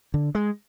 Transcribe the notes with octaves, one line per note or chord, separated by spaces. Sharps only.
D3
G#3